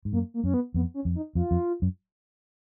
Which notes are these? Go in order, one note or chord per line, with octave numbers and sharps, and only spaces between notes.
G#2
F#2 A#3
A#3
F#2 C#4
B3
F2 B3
C#4
F2
D#4
F2 F4
F2
F#2